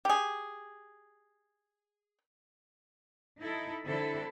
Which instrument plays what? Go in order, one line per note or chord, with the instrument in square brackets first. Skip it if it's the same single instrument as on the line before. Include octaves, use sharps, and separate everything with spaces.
[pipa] G4 G#4
[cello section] D#4 E4 A4
D3 C4 E4 A4